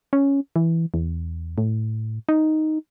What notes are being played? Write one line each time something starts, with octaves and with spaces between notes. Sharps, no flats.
C#4
E3
E2
A2
D#4